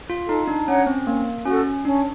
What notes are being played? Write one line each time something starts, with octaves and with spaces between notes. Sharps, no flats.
F4
D#4 A4
D4
C#4 C#5 F#5 A#5
C4
A#3 C#4
C#4 F#4 A4
C#4 D4